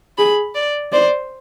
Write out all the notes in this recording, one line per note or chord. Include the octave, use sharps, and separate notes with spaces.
G#4 B5
D5
C5 D5